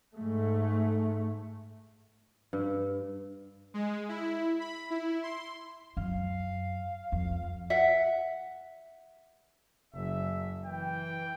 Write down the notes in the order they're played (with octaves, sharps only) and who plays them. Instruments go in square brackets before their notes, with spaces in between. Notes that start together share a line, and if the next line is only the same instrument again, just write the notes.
[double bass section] G#2 A3
[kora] G2
[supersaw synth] G#3
E4
B5
E4
C6
[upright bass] F#2 [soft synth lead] F5
[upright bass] F2
[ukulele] E5 F#5
[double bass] F#1 [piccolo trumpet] E5
[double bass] E3 [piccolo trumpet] G5